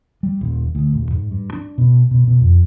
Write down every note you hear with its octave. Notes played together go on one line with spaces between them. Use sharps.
G3
D#1
D2
D#1
G#2
G2
D4
B2
B2
B2
F2